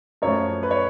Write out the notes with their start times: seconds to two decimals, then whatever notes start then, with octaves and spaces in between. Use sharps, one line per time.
0.22 F#2 F3 A3 C#5
0.63 B4
0.71 C#5